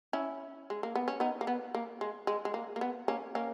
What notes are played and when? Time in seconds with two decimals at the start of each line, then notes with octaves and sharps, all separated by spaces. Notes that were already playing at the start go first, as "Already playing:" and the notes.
0.13 C#4 E4
0.70 G#3
0.83 A#3
0.95 B3
1.08 C#4
1.20 B3 D#4
1.41 A#3
1.47 B3
1.75 A#3
2.01 G#3
2.27 G#3
2.45 G#3
2.54 A#3
2.76 A#3
2.81 B3
3.08 A#3 C#4
3.35 A#3 C#4